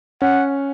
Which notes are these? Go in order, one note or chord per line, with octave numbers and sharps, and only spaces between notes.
C#4 F#5